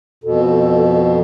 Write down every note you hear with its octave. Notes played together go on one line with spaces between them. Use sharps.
F2 B2 A4